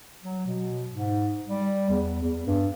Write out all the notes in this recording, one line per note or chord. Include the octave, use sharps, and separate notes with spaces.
F#3
B2
G#2
G3
E2
E2
G2